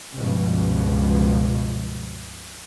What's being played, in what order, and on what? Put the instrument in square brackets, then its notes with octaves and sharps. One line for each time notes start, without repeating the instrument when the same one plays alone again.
[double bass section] C#2 G2 B2 F3